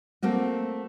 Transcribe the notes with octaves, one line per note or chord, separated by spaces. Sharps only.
A3 A#3 C4 F#4